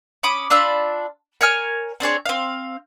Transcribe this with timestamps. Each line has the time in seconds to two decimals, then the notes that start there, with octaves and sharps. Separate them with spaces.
0.23 C#4 B5 D6 D#6
0.50 D4 F4 B5 E6
1.41 A#4 C#5 G#5 F6
2.00 C4 D4 G#4 C#5
2.26 C4 F5